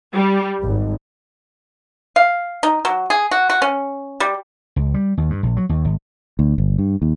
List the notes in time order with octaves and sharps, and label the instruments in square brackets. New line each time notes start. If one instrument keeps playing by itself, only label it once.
[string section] G3
G#1
[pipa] F5
D#4
F#3
G#4
F#4
F#4
C#4
G3
[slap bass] C#2
G3
D#2
G2
A#1
F#3
D#2
G#1
[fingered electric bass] D2
G1
G2
D#2